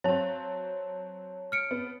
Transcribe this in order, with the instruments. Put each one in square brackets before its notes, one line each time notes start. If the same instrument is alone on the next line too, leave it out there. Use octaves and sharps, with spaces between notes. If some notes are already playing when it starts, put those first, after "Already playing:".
[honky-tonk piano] F#3 C4 [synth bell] C#5 A5
[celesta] F6 C#7 D7
[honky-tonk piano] B3